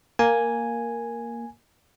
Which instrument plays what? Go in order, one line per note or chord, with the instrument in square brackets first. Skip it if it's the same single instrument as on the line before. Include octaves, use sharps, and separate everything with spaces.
[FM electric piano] A#3 [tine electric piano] G#5